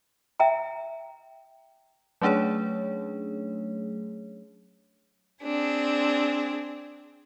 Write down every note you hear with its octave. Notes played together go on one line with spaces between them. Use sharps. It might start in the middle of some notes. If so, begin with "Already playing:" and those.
E5 G5 A#5
F#3 A3 C#4 D4 G#4 C#5
C4 D4 G#4